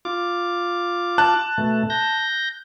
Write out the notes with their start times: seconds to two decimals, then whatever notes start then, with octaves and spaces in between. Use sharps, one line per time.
0.05 F4 D6
1.18 A5 F#6
1.58 B2 A3
1.90 G6 A#6